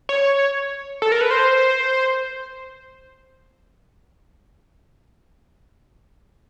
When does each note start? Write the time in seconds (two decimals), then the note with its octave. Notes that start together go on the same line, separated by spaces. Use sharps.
0.09 C#5
1.02 A4
1.12 A#4
1.21 B4
1.31 C5